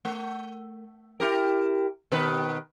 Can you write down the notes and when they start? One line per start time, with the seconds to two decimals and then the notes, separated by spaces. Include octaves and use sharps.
0.05 A3
1.20 E4 G4 A#4
2.12 B2 D#3 B4